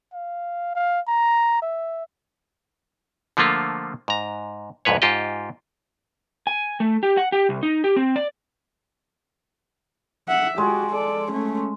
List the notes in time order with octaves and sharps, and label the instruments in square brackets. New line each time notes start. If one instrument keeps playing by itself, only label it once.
[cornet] F5
F5
A#5
E5
[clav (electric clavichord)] D3 F3 A3 A#3 F4
G#2 A#5
C2 F2 G#2 B4 C#5
G#2 F4 G4 D#5
[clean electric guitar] G#5
A3
G4
F#5
G4
C2
D#4
G4
C4
D5
[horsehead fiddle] E5 F#5
[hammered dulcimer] G#3 [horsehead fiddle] F#4 G4
[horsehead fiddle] A4 D5
A3 C#4